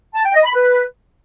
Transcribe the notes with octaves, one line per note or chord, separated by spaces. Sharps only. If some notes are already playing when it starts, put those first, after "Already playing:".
A5
G5
D#5
B5
B4